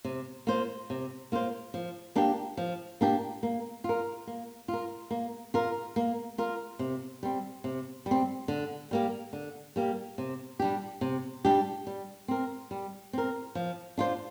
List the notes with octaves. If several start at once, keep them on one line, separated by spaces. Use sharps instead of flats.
C3
A#3 F4 C5
C3
A#3 F4 C5
F3
A#3 D4 G4
F3
A#3 D4 G4
A#3
F4 A#4
A#3
F4
A#4
A#3
F4 A#4
A#3
F4 A#4
C3
G3 C4
C3
G3
C4
D3
G3 A#3 G4
D3
G3 A#3 G4
C3
G3 D4 G4
C3
G3 D4 G4
G3
C4 A#4
G3
C4 A#4
F3
D4 F4 C5